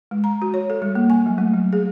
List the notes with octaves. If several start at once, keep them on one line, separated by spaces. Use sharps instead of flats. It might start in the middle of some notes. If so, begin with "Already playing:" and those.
G#3
A#5
F#4
C#5
A4
G3
A#3
G#5
F#3
A3
F#3
G#4